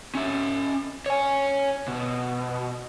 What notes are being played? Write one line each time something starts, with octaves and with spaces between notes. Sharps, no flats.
C#4 E5
C#5 G#5
B2